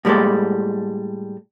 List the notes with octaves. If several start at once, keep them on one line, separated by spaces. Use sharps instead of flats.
A2 G3 G#3 A#3 A4